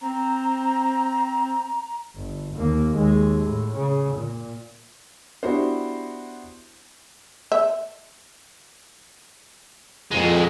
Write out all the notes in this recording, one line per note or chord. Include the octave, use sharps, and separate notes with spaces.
C4 A#5
G1
D#2 A#3
D#2 G#3
A2
C#3
A#2
B3 D4 E4 F#4 G4 C5
E5
F2 A#2 G#3